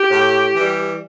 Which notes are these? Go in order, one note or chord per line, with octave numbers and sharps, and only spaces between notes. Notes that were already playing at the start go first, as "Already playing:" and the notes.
Already playing: G4
A2
E3 G3